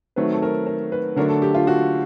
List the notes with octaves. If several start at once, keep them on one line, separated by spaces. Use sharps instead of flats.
D#3 F#3 A3 C4 B4
A4
A#4
A#4
B4
D3 F#3 A3 D4 A#4
A4
G4
F4
F#4